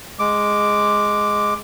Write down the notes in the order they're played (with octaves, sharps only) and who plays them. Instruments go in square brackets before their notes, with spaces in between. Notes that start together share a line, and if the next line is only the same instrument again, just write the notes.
[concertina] G#3 D6